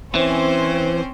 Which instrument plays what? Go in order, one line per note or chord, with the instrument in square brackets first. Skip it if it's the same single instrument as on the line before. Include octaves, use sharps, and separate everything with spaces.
[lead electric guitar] E3 [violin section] C4 C#4 C5